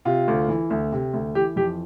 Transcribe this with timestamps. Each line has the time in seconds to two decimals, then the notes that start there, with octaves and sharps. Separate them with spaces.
0.05 C3 F4
0.28 D2
0.48 E3
0.70 D2
0.92 C3
1.13 D2
1.35 E3 G4
1.56 F2 G4